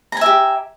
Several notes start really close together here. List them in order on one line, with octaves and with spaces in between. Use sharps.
A#5 G#5 E5 G4